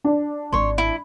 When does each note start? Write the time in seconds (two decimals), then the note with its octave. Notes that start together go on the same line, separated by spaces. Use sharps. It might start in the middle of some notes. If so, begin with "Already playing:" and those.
0.04 D4
0.52 G#1 G#3 C#5 C6
0.78 E4